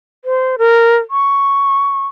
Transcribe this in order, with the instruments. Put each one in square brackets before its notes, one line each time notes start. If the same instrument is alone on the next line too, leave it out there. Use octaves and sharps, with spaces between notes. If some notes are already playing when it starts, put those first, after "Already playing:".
[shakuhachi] C5
A#4
C#6